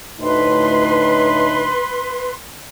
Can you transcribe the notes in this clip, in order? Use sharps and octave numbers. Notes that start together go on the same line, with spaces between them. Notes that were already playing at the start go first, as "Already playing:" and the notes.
D2 A2 D#4 B4 C6